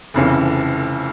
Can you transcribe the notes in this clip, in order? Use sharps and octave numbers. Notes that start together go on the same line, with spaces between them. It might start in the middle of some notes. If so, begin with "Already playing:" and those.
F1 F2 C#3 E3